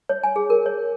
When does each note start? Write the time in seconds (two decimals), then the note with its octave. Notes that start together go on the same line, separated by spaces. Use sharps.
0.09 C#5
0.23 G#5
0.36 G#4
0.50 A#4
0.66 C#5